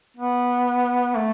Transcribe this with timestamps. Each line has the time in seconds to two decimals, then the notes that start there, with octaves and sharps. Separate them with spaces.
0.17 B3
1.17 A3